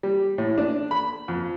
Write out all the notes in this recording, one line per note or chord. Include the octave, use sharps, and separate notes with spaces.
G3
A2
D4
B5
F2